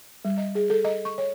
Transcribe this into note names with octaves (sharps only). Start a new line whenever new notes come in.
G3
D#5
G#4
A4
D#5
C#6
C#5